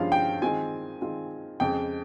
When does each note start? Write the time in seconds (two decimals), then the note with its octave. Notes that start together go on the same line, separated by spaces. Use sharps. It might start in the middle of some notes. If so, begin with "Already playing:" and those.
Already playing: G2 F3 G#3 C#4 F4 F5
0.12 G5
0.42 D#3 G#3 C4 F4 G#5
1.01 D#3 G#3 C4 F4
1.60 F2 C#3 G#3 G5